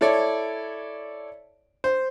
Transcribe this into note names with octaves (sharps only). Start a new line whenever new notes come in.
E4 A4 C#5 D5
C5